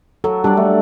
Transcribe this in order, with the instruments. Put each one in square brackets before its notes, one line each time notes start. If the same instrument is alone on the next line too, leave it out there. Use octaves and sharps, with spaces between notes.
[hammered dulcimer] F#3 [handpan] A4
[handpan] G3 G4 [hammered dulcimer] D4 D5
[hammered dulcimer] A3